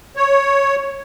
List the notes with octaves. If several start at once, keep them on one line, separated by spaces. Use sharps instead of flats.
C#5